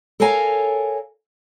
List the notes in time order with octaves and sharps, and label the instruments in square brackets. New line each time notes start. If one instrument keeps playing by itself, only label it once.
[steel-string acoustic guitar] A4 A#4 C#5 F5 G#5 A#5